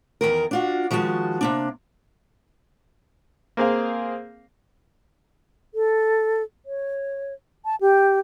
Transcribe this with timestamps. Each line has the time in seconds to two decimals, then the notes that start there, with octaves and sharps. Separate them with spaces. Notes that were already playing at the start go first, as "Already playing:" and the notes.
0.21 E2 C3 D#3 A#4
0.51 D4 F4 F#4
0.91 D#3 F3 G#3 F#4 A5
1.41 C3 A#3 D4
3.57 A#3 C4 G#4 F5
5.75 A4
6.66 C#5
7.65 A5
7.81 G4